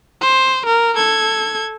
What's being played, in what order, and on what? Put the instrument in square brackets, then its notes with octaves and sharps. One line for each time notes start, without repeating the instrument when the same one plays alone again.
[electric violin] C5
A#4
A4 G#6